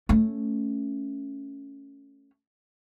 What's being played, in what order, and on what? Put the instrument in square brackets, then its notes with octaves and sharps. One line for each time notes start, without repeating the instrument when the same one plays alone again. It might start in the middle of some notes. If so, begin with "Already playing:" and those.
[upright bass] A3 C#4